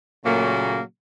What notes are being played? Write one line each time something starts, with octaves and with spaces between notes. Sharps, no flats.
A#2 C#3 F#3 A3 A#3